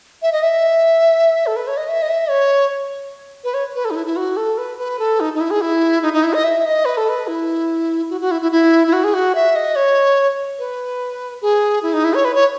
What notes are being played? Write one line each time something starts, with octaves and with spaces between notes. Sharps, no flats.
E5
D#5
E5
A4
B4
C#5
D#5
E5
D#5
E5
C#5
B4
C#5
B4
A4
D#4
E4
E4
F#4
A4
B4
B4
A4
D#4
D#4
E4
G#4
E4
D#4
D#4
E4
D#5
E5
D#5
B4
A4
B4
E4
F#4
F#4
E4
E4
E4
E4
F#4
G#4
F#4
E5
D#5
C#5
B4
G#4
E4
D#4
E4
C#5
B4
C#5